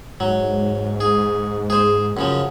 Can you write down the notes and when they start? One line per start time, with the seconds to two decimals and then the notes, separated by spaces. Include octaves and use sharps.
0.20 G#2 F#3
1.01 G#4
1.70 G#4 C5
2.17 F#2 C#3 F3